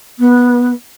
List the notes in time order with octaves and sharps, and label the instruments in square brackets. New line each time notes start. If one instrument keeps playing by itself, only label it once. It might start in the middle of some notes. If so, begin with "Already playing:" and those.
[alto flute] B3